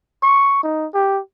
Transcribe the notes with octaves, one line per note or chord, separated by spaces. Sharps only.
C#6
D#4
G4